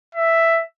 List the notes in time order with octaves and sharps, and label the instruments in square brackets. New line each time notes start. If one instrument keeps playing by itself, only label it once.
[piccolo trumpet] E5